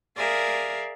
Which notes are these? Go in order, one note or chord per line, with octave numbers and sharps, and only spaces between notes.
G#4 A#4 D5 E5 F5